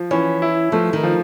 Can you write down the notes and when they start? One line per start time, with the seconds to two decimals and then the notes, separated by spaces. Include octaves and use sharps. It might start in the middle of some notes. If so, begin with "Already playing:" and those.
Already playing: F3
0.11 E3 C#4
0.42 E4
0.72 F3 A3
0.93 D#3
1.03 F3